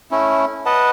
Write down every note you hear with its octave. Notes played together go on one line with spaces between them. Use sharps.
A3 C#4 E4
B4 D#5 F#5 A5